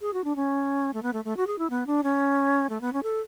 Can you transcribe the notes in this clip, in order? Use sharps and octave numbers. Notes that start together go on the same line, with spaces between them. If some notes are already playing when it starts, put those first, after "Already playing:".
G#4
F#4
D4
C#4
A3
B3
A3
A3
F#4
G#4
E4
B3
D4
C#4
A3
B3
C#4
A4